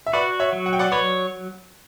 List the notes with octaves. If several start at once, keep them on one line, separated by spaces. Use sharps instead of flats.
E5
F#4 B4 D5
C#5 E5
F#3
F#5
G5
D5 F#5
B4 C#5 D5